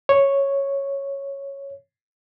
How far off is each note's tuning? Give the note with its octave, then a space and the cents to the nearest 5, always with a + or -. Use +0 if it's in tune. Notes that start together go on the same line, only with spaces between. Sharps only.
C#5 -5